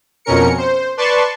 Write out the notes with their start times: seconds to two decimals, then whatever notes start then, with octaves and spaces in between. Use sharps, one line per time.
0.25 F2 B2 C#4 A#4 C#7
0.58 C5
0.97 B4 D5 A5 C6 C#6